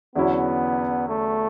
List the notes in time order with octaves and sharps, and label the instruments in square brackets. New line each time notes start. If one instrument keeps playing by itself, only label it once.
[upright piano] E2 D3 F#3 C#4 E4 [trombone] B3
[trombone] A3